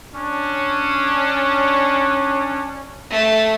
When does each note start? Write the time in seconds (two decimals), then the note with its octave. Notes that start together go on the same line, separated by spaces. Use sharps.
0.13 C#4 D4
3.11 A3